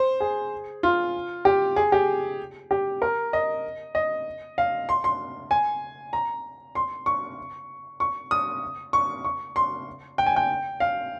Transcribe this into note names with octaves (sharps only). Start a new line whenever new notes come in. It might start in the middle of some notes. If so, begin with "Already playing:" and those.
Already playing: C5
G#4
F4
G4
G#4
G4
G4
A#4
D#5
D#5
F5
C6
C6
G#5
A#5
C6
C#6
C#6
D#6
C#6
C#6
C6
G5
G#5
G5
F5